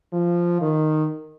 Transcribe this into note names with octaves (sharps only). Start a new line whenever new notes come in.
F3
D#3